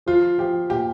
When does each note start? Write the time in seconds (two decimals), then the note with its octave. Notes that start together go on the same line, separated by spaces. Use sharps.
0.06 F3 F4
0.38 F3 G4
0.70 A#2 G4